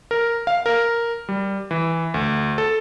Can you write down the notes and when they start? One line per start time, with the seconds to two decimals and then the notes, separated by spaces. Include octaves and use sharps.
0.11 A#4
0.47 F5
0.66 A#4
1.29 G3
1.71 E3
2.14 D2
2.58 A4